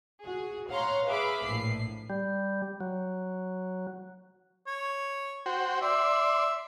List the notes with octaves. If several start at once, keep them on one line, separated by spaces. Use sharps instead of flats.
F#4 G#4
C#5 F5 F#5 A#5 C6
G#4 B4 E5 F5 B5 D6
A#1 A2 C7
G3
F#3
C#5
F#4 C5 G5
D5 E5 C6